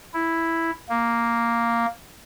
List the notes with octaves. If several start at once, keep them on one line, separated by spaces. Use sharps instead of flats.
E4
A#3